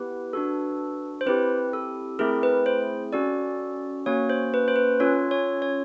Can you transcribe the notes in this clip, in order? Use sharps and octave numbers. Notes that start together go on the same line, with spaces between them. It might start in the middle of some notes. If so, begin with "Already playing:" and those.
Already playing: B3 E4 G4 B4
D4 F#4 A4
C5
C4 E4 G4 B4
A4
A3 C4 E4 G#4 A#4
B4
C5
C#4 F#4 A4 D5
A#3 C#4 F#4 C#5
C5
B4
C5
B4
C#4 F4 A4 C#5
C#5
C#5